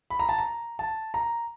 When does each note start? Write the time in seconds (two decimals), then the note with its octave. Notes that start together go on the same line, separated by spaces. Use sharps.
0.10 B5
0.19 A#5
0.29 A5
0.38 A#5
0.79 A5
1.14 A#5